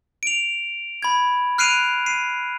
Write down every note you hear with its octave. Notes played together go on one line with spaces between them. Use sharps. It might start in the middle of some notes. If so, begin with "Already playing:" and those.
D7 F7
B5 G#6
F6 F#6 C7 D7 D#7 F7
C7 D#7